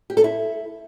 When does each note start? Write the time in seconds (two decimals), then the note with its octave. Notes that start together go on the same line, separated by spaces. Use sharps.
0.10 G4
0.17 A4
0.24 E4